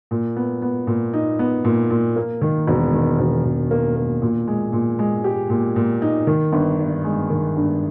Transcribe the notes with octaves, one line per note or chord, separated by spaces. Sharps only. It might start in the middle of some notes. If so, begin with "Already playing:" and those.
A#2
B3
B3
A#2
D#4
B3
A#2
A#2
A#3
D#3
E1
D#3
E1
E1
A#3
A#3
A#2
G#3
A#2
G#3
G4
A#2
A#2
D#4
D#3
G1
G2
G#3
D#3
G2